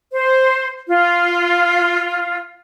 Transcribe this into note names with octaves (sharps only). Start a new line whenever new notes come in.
C5
F4